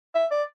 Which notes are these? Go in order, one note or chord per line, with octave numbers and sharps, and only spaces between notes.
E5
D5